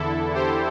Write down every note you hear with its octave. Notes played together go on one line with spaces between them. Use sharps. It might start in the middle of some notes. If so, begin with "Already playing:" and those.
Already playing: E2 D3 E4 A4
G4 C5